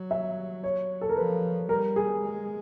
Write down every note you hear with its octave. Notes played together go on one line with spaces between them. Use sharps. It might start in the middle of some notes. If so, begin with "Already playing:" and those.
Already playing: F#3
E5
C#5
A4
A#4
F3 B4
G3 A#4
G#4
G#3